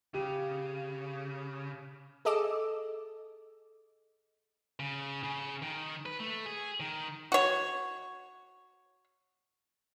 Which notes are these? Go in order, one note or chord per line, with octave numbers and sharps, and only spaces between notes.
C#3 G4
G#4 A4 D#5 D6 E6
C#3
C#3
D#3
B4
A3
G#4
D#3
F#4 C#5